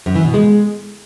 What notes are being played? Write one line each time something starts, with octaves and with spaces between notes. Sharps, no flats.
F#2
E3
B2
G#3